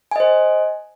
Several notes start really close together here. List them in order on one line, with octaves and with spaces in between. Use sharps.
G#5 D#5 C5